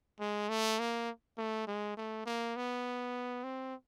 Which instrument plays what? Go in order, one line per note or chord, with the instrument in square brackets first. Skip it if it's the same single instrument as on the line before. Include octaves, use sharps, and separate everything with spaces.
[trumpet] G#3
A3
A#3
A3
G#3
A3
A#3
B3
C4